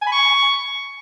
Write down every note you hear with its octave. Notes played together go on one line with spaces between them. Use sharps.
G#5
B5
C#6